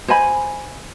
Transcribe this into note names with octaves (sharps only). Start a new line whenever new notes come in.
C5 D#5 G#5 B5